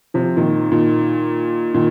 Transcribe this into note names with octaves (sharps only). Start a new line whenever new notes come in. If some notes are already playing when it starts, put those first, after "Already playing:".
C3 F3
A#2 D#3
A#2 D#3
A#2 D#3